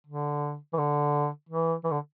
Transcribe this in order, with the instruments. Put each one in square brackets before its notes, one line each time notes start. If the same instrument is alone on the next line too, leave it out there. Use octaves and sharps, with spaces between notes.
[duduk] D3
E3
D3
E3
E3
D3